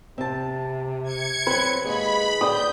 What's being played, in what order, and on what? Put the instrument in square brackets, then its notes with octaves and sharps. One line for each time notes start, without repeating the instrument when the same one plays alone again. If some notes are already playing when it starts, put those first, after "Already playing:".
[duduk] C3 [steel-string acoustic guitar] C4 A5
[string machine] G#6 C#7
[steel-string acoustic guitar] F#3 C4 [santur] B4
[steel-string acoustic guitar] D#2 G#3 [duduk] G#4 [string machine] B5
[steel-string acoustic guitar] D2 D4 G5 [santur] D#6 [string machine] G6